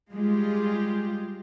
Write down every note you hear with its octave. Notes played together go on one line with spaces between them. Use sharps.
G3 G#3 F4 G4 G#4